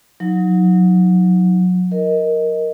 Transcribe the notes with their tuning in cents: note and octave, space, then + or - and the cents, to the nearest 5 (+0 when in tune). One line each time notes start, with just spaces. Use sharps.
F#3 -30 D#4 +25
A#4 +0 D#5 +15